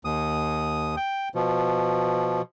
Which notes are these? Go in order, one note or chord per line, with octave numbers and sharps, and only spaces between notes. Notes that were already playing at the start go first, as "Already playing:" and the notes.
D#2 D#6
G5
B2 F3